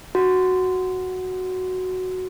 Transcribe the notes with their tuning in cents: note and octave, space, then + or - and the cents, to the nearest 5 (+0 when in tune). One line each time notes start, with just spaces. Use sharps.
F#4 +0